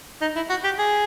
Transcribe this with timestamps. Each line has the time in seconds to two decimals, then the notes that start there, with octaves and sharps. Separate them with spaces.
0.22 D#4
0.36 E4
0.50 F#4
0.64 G4
0.79 G#4